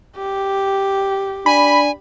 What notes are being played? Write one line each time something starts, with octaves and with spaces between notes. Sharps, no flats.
G4
D4 G#5 B5